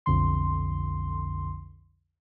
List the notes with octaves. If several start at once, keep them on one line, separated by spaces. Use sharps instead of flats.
B1 F2 D3 C6